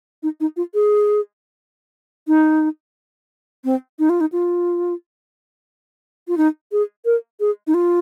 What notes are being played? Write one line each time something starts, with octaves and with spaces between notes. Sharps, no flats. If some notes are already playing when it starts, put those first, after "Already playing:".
D#4
D#4
F4
G#4
D#4
C4
D#4
F4
D#4
F4
F4
D#4
G#4
A#4
G#4
D#4
F4